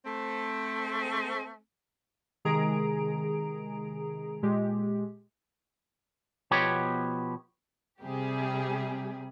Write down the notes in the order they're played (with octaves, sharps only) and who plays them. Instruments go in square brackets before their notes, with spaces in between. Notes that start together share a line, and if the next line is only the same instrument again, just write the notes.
[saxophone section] A3 C4
[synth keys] C3 D#3 G#3 G#4 A#5 D7
A#2 G#3 G4
[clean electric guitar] B2 F3 B3 G4 C#5
[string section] C3 G3 G4 G#4